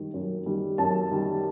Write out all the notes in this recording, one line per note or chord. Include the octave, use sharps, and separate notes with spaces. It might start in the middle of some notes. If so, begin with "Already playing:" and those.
Already playing: F#2 D#3 G3
F#2
D#3 G3
F#2 A5
D#3 G3